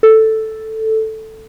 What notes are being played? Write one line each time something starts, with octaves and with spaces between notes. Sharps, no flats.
A4